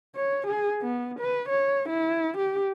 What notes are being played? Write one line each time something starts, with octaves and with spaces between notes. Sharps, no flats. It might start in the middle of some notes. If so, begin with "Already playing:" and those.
C#5
G#4
B3
B4
C#5
E4
G4